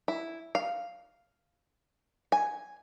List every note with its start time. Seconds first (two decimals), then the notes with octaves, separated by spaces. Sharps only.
0.08 E4
0.55 F5
2.32 G#5